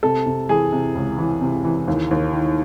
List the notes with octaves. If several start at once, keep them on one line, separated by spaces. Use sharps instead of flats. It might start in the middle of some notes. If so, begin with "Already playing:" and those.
C3 A4
C3
E3 G#4
C3
C#2
E3
C3
E3
D#2
D#2
D#3